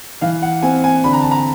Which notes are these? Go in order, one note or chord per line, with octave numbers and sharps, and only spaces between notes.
E3 F5
F#5
C4 G#5
G#5
D3 B5
A#5
A5
A#5